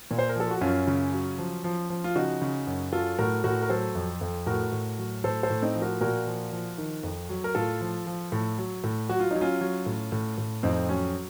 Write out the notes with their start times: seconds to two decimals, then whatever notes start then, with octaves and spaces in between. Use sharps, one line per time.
0.11 A#2
0.19 C5
0.29 A#4
0.36 F3 A4
0.51 F#4
0.61 F#2 C#4 F4
0.87 C#3
1.13 F#3
1.38 F3
1.64 F3
1.90 F3
2.04 F4
2.15 C#3 D#4 F#4
2.42 C#3
2.67 F#2
2.92 F#3 F4 A4
3.19 A2 F#4 A#4
3.44 A2 F#4 A#4
3.63 A#4
3.69 F#3 A4 C5
3.95 F2
4.21 F2
4.47 A2 F#4 A#4
4.72 A2
4.98 F#3
5.24 A2 A4 C5
5.43 A4 C5
5.50 A2
5.62 C4 D#4
5.76 F3
5.82 F#4 A#4
6.01 A#2 F#4 A#4
6.27 F3
6.52 F3
6.78 D#3
7.03 F2
7.29 F#3
7.44 A#4
7.55 A2 F4 A4
7.81 F3
8.07 F3
8.32 A2
8.58 F#3
8.84 A2
9.09 F#3 F#4
9.20 F4
9.31 F#3 D#4
9.41 C#4 F4
9.61 F#3
9.86 A2
10.12 A2
10.38 A2
10.63 F2 C4 D#4
10.89 F#3 C#4